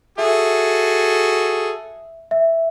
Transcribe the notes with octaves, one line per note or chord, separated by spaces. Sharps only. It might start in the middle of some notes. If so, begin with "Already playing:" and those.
F#4 G#4 A4 E5
E5